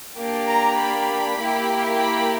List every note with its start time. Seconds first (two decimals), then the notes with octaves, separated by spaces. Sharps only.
0.17 A#3 D4 G4
0.47 A#5
0.77 B5
1.38 A#3 E4 G4
1.99 B5